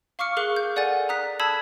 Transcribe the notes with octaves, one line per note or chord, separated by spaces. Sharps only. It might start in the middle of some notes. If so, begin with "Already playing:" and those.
F5 C#6 D6 F6 C#7
G#4 A#4 F5 C#6 D6 F#6
G6
A4 D5 F#5 G#5 A6 D#7
A#5 D#6 F#6 B6
A5 B5 D#6 E6 G#6 B6